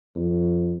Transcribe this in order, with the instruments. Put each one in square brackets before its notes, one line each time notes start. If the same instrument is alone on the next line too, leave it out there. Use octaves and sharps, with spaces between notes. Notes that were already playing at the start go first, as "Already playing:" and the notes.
[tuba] F2